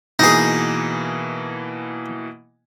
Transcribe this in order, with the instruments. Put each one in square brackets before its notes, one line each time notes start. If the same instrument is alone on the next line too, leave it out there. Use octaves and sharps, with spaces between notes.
[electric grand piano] B2 E3 A#3 [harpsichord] D#4 G#4